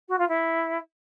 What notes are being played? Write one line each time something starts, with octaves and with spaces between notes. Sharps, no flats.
F#4
F4
E4